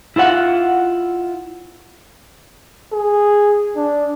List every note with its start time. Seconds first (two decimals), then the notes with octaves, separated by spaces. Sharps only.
0.16 E4 F4 B4 F#5
2.92 G#4
3.77 D4